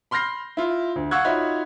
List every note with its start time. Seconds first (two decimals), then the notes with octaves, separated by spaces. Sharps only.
0.11 B5 C6 F6 G6 A#6 C7
0.57 E4 F4
0.96 D2
1.11 F5 F#5 C#6 E6 F#6 G#6
1.24 D#4 F4 F#4 C#5 E5 B5